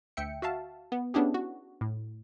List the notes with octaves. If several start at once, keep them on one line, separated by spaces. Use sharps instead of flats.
D2 E5 G5 C#7
F#4 E5 F5 A5
B3
B3 C#4 D4 E4 G4 G#4
F#4
A2